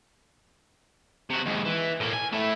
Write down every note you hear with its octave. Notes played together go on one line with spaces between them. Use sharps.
C3 F#4
D#2 G#2
E3
A2 A#3
G#5
A3 E4